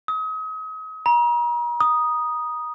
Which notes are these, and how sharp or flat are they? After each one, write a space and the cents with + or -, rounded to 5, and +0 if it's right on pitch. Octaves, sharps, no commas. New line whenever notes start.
D#6 +35
A#5 +40
D#6 -5